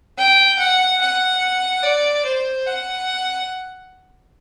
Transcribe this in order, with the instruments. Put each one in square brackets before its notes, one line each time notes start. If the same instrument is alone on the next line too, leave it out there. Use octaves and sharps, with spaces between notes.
[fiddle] G5
F#5
F#5
D5
C5
F#5